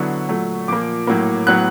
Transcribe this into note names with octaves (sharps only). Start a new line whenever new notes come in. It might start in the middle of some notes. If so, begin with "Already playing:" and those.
Already playing: D3 F#3 B3 E4 C#6
A#2 F#3 A3
A#2 F3 A#3 D6
A2 F#3 A#3
A2 F#3 B3 F#6